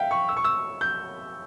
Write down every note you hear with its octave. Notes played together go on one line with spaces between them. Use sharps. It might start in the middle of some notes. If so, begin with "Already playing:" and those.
Already playing: E5 F5 G5
C#6
E6
C#6
E6
G6